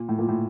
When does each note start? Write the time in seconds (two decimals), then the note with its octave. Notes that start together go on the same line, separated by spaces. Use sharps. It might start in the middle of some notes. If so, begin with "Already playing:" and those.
Already playing: A#2
0.09 A2
0.19 A#2
0.28 A2